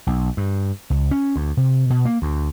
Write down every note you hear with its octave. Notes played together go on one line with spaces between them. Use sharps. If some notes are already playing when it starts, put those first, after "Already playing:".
B1
G2
C#2
C#4
D2
C3
B2
A#3
D2